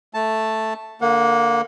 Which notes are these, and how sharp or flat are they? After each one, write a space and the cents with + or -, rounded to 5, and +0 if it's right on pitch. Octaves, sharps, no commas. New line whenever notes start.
A3 +0 A5 +0
D3 +0 A#3 +0 F#5 -35